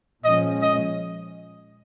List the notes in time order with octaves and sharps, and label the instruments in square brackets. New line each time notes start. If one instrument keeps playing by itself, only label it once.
[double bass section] A#2 F3 G#3 C#4 [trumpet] D#5
[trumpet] D#5